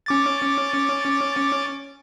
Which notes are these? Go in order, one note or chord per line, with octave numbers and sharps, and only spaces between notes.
C#4 D6 A6